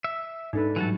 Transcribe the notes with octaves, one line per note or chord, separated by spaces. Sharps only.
E5
G#2 G#3 D4 D#4 A4 B4
A2 E3 F#3 G3 F#4 A4